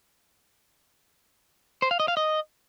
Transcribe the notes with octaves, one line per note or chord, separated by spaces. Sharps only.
C5
F5
D#5
F5
D#5